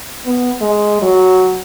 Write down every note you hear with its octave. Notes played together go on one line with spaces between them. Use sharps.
B3
G#3
F#3